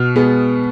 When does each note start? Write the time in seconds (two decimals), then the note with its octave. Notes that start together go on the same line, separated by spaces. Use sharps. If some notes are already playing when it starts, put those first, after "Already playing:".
Already playing: B2 F6
0.16 G#3 B3